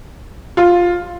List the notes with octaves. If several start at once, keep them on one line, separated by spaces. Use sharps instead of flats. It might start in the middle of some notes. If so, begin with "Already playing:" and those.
F4